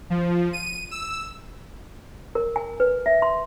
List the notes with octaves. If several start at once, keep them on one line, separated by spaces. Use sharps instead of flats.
F3
D#7
E6
A#4
G#5
B4
E5
C6